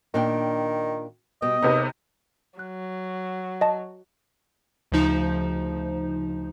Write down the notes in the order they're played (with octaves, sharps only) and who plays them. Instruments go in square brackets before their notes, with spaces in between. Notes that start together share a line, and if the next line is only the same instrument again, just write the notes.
[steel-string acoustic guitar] A#2 D4 G5 [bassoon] D#3
[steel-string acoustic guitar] B2 G3 G5 [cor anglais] D#5
[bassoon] D#2 [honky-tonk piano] C3 B3 D#4 [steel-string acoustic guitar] G#4
[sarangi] F#3 [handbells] F#6
[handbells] D#5 A5
[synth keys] D2 C#3 F3 D#4 C5